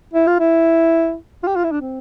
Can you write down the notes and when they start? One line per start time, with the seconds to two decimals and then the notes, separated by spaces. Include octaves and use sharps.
0.14 E4
0.27 F4
0.40 E4
1.43 F4
1.47 G4
1.56 F4
1.64 E4
1.72 D4
1.81 C4